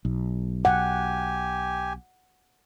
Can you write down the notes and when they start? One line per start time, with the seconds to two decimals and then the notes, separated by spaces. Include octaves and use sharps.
0.05 B1
0.65 G4 F#5 G#5